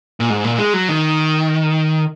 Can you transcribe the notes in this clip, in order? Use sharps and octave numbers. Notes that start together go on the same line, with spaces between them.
A#2
G#2
A#2
G#3
F#3
D#3